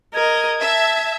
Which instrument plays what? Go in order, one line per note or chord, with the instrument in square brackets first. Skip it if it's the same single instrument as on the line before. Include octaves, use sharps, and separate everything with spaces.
[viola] A#4 D#5 [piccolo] G#6
[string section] E5 [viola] A5